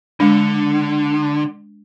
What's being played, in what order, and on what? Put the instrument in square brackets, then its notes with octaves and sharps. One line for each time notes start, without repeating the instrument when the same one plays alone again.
[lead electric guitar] D3 [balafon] G#3 D4